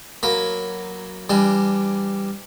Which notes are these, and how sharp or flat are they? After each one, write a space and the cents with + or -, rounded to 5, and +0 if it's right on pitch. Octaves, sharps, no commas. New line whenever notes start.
F#3 +0 A#3 +0 B5 +0
E3 +30 G3 +10 D4 +0